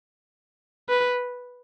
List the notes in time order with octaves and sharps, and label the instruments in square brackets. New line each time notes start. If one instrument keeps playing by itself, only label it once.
[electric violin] B4